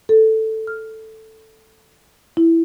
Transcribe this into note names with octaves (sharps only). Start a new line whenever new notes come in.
A4
F6
E4